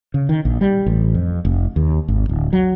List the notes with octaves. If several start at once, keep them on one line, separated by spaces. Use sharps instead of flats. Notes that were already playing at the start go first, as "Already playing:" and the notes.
C#3
D#3
A#1
G3
A1
F2
F1
D#2
G#1
D1
F#3